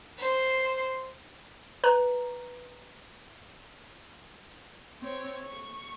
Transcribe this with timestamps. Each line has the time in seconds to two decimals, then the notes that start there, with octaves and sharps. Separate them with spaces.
0.18 C5 C6
1.84 B4 A#5
5.01 C4 C#5
5.46 C#6